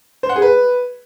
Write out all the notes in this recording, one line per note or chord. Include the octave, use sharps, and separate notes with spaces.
C5
F#5
G#4
B4